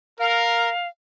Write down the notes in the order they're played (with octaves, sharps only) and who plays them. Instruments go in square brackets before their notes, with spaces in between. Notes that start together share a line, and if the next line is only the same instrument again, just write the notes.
[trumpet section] A#4 [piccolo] F5